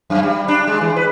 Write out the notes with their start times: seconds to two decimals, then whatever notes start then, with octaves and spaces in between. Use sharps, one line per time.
0.10 F#2
0.23 G3
0.48 D4
0.67 G#3
0.81 E3
0.96 B4